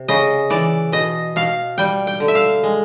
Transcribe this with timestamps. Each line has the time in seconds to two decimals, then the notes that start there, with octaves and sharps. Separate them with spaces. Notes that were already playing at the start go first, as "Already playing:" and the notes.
Already playing: C3
0.08 C#3 D#5
0.50 E3 D5
0.92 B2 D#5
1.36 B2 F5
1.78 G3 G5
2.07 G5
2.20 D3
2.28 E5
2.35 F5
2.63 G#3